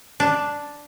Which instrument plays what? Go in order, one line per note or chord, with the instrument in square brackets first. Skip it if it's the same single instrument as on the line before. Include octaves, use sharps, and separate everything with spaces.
[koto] D4